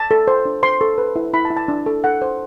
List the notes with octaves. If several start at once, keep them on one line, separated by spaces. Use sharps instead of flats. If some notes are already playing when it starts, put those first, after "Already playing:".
Already playing: A5
A4
C5
D4
C5 C6
A4
B4
E4
E4 B5
A5
E4
A5
D4
A4
A4 F#5
C5